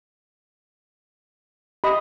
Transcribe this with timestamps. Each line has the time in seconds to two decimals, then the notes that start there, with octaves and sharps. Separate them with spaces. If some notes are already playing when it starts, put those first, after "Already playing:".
1.84 G4 D#5 B5 D#6